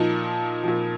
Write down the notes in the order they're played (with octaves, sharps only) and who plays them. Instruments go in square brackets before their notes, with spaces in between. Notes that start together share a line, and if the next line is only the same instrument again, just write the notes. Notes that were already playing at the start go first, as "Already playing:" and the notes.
Already playing: [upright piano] A#2 F3 D#4
A#2 F3